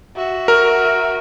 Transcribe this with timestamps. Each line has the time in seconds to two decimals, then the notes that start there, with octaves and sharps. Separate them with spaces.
0.16 F#4 E5
0.48 A#4